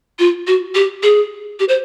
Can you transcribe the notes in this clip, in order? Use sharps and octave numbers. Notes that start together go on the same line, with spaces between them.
F4
F#4
G4
G#4
G4
C5